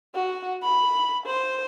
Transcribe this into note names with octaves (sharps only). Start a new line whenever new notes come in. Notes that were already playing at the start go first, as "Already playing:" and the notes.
F#4
B5
C5